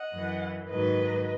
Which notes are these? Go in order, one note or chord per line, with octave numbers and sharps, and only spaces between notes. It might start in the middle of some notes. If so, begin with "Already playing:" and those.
Already playing: D#5 F#5
F#2 E3
G#2 D#3 F#3 B4 D#5